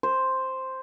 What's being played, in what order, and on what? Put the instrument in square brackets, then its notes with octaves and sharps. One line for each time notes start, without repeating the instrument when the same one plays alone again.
[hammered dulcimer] C5